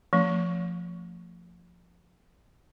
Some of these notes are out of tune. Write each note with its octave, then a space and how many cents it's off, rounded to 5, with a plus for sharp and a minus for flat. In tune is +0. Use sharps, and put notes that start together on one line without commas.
F3 +0 A3 +35 C#4 +0